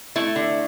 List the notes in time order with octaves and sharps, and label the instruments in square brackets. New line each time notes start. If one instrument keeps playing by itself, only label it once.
[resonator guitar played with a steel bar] A3 E4
D3